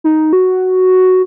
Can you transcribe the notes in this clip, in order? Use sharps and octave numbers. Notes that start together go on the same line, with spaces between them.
D#4
F#4